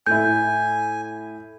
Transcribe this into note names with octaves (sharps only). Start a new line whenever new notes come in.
A2 E4 G#5 G6